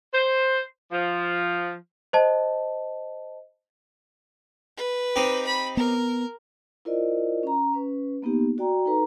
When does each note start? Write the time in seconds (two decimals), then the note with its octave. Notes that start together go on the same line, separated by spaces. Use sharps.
0.13 C5
0.92 F3
2.13 C5 D#5 A5
4.77 B4
5.16 C4 D#4 G4
5.47 B5
5.77 B3 A#4
6.85 E4 F4 A#4 C5 D5 D#5
7.43 C#4 A#5
7.74 C#4 B4
8.22 A#3 B3 D#4 G4
8.58 F#4 D5 G5 A#5
8.86 D#4 A4 B4 A#5